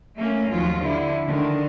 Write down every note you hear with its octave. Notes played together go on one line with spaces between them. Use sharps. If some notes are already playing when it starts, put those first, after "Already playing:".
A3 A#3 C#4
D#2 F3 F#3 F4
D3 F3 E4
D3 D#3